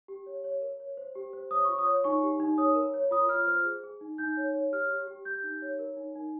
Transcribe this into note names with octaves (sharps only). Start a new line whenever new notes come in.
G4
C#5
C#5
A#4
C#5
C5
G4
C5
C#5 D#6
F4 C#6
D#6
C#5
D#4 C#6
G4
D#4
C#5 D#6
A#4
C#5
F4 D#6
F4 F6
C5 F6
G#4
G#4
D#4
D#4 G6
C#5
C#5
G4 F6
G4
G4
G4 G6
D#4
C#5
A#4
D#4
D#4